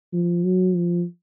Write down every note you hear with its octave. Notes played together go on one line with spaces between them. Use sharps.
F3
F#3
F3